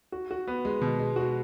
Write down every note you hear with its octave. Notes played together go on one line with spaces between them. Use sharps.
F#4
F#4
B3
G#3
B2
G#3
F#4